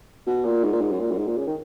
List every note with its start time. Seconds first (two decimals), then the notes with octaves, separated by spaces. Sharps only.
0.26 B2
0.44 A#2
0.64 G#2
0.73 A#2
0.81 G#2
0.91 F#2
1.00 A#2
1.12 F#2
1.18 G#2
1.28 A#2
1.37 C#3
1.47 D#3